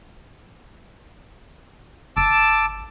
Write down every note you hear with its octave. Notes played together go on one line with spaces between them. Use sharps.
G1 A5 D6 E6